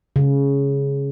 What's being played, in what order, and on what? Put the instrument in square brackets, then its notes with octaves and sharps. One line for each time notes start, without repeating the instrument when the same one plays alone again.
[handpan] C#3